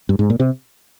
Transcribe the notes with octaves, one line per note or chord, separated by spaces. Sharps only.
G2
G#2
A#2
C3